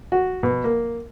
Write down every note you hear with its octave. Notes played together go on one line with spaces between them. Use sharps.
F#4
B2
A#3